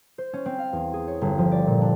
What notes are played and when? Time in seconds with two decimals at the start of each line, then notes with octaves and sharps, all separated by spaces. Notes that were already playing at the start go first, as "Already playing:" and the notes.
0.18 C5
0.33 C#4
0.46 C4
0.58 F5
0.73 E2
0.93 G#4
1.07 C#5
1.21 G1
1.38 F3
1.52 D5
1.67 A#2
1.81 D4